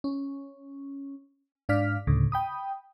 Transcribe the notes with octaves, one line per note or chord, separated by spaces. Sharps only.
C#4
G#2 D4 D5 F5 F6 B6
D2 A2 C#3
G5 B5 D#6